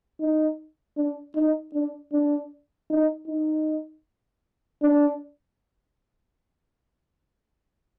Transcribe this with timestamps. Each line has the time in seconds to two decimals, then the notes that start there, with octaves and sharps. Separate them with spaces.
0.21 D#4
0.97 D4
1.36 D#4
1.74 D4
2.13 D4
2.90 D#4
3.27 D#4
4.83 D4